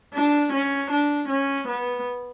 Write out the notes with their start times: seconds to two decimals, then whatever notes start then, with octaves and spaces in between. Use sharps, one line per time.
0.14 D4
0.53 C#4
0.91 D4
1.29 C#4
1.68 B3